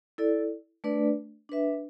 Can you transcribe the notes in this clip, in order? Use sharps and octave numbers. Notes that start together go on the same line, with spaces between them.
E4 A4 D5
A3 D4 B4 D5
D4 B4 E5